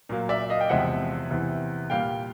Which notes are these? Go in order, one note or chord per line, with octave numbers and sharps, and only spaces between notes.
A#2 F#3 A#3
D5 E5
D#5 F5
G5
E2 C3 F3 G#3 E5 F#5
E2 C3 E3
A#2 G3 A#3 F5 G5